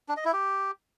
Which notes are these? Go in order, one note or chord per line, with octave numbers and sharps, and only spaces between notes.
D4
D#5
E4
G4